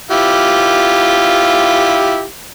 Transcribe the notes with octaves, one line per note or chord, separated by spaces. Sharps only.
E4 F4 G4